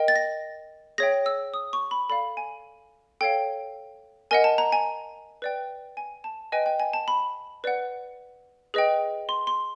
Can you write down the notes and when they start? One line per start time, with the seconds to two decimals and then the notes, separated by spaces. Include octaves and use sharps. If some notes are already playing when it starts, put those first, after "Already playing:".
Already playing: A#4 D#5 G5
0.08 A6
0.16 A#6
0.98 G#4 C#5 E5 G5 A#6
1.26 E6
1.54 D#6
1.73 C#6
1.91 B5
2.09 A4 D5 F5 B5
2.37 G#5
3.21 A4 C#5 F5 G5
4.31 A#4 D#5 F#5 G#5
4.44 A5
4.58 A#5
4.72 G#5
5.42 B4 D5 G5
5.97 G#5
6.24 A5
6.52 B4 D#5 G5 G#5
6.66 G5
6.80 G#5
6.93 A5
7.08 B5
7.64 B4 D5 F#5
8.74 G#4 B4 D#5 G5
9.29 C6
9.47 C6